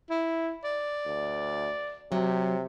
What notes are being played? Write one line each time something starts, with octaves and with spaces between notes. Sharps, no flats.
E4
D5
D2
C3 F#3